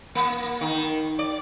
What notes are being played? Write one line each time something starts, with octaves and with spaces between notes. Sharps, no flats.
A#3
D#3
D5